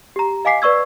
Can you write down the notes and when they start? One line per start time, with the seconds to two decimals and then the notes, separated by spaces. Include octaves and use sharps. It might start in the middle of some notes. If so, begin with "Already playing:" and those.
0.16 G4 A#5
0.45 D#5 F5 G#5 D6 B6 C7
0.62 B4 D5 C#6 E6 G#6